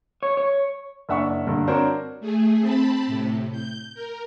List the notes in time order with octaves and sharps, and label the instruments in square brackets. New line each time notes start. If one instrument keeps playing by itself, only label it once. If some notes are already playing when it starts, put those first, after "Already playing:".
[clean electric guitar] C#5
C#5
[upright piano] F#1 D4 E5 F#5 C#6
G2 D3 A#3
C4 D4 F#4 A#4 C5 C#5
[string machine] A3 G#4
C4 A5 B5
A2 C3
G6
A#4